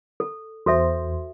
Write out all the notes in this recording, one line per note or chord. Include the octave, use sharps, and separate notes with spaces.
A4
E2 F#4 A4 C5 E5